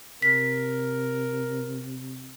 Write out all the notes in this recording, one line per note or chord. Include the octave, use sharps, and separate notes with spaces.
C3 A#4 B6